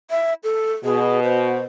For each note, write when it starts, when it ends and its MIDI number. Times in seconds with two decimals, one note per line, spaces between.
0.10 0.34 76
0.44 0.73 69
0.84 1.66 47
0.84 1.20 68
1.23 1.63 72